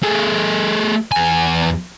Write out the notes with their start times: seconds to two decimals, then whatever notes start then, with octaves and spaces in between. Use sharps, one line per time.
0.03 A3 G#4
1.12 E2 G#5